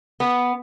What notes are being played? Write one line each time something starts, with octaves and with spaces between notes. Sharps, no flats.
B3